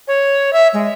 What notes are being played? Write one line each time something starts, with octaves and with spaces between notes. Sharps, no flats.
C#5
E5
G#3